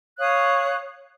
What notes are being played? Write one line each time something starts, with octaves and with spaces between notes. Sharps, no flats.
C#5 F5 D#6 F#6